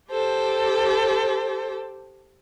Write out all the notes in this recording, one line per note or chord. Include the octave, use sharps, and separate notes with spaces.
G4 A4 C5